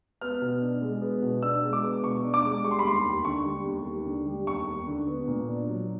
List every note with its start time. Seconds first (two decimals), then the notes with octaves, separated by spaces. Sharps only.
0.21 B3 F6
0.42 B2
0.62 D4
0.82 G#3
1.02 B3
1.22 B2
1.42 D4 E6
1.63 G#3
1.73 D6
1.84 B3
2.03 B2 C#6
2.24 D4
2.34 D6
2.44 G#3
2.64 G3 C#6
2.71 C6
2.79 B5
2.84 D#2 C6
3.05 D#2
3.25 D3 C#6
3.45 G3
3.65 D#2
3.86 D#2
4.06 D3
4.26 G3
4.47 D#2 C#6
4.68 D#2
4.87 D3
5.07 B3
5.28 A#2
5.49 D4
5.68 F#3